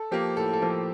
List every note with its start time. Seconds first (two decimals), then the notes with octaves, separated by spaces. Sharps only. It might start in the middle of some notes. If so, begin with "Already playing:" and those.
Already playing: A4
0.11 F3 A#3 G4
0.37 A2 A4
0.53 A4
0.62 F3 A#3
0.70 A4